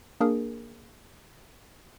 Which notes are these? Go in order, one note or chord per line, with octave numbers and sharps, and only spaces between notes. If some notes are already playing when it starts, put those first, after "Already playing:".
A#3 D4 G#4 A#4